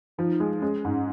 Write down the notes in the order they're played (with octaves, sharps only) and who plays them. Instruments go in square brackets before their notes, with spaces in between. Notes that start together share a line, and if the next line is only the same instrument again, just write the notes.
[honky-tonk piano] F3 [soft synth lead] D#4
[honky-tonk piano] G#3
[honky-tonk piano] G#3 [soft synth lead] C#4
[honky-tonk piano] G#2